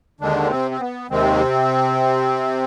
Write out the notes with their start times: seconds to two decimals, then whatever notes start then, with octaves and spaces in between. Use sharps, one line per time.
0.20 D#2 D3 D#3 G#3 D4
0.50 C3 C4
0.71 C4
0.80 B3
1.10 D#2 C3 D#3 G#3 C4